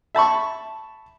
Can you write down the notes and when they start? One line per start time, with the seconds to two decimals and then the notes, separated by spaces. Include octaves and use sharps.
0.15 E5 A5 B5 C#6